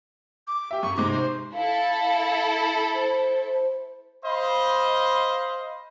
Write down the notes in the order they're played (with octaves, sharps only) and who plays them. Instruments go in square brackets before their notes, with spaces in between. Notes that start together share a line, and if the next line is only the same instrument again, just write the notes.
[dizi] D6
[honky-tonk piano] G4 E5
[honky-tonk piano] F#2 [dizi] C#6
[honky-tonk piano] G#2 C3 G#3 [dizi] D6
[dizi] C5
[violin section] E4 A4 [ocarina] F5
[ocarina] C5
[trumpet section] C5 D#5 F5 B5